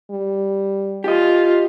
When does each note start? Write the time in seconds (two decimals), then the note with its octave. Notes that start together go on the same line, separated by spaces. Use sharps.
0.11 G3
1.04 F4 G4 D#5